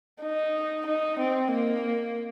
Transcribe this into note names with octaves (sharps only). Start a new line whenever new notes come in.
D#4
D#4
C4
A#3